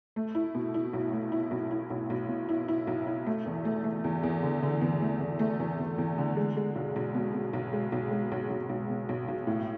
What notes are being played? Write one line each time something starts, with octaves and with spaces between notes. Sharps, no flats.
A3
E4
B2
E4
B1
A3
E4
B1
E4
B1
B1
B2
E4
E4
B1
E4
A3
E2
A3
A3
E2
E2
D3
D3
E2
A3
E2
A3
E2
E2
E2
D3
G#3
G#3
B1
B1
B2
B2
B1
G#3
B1
G#3
B1
B1
B1
B2
B1
B1
A2